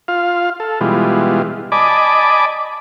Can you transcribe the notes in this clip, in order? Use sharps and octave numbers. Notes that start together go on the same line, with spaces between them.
F4 F5
A4
B2 E3 G3 G#3 F4
D5 D#5 G#5 A5 B5 D6